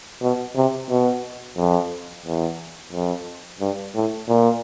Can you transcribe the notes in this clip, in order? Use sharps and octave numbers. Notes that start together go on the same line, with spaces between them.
B2
C3
B2
F2
E2
F2
G2
A2
A#2